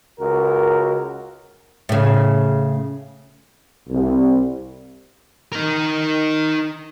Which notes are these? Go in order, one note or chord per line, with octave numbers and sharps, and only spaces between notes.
C#2 F#4 A#4
A2 C#3
C2
D#4 A#4